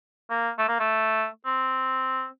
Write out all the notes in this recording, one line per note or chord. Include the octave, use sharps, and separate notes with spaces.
A#3
A3
A#3
A3
C4